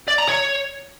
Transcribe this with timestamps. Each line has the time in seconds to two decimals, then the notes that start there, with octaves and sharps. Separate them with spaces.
0.08 D5
0.18 A#5
0.28 C#5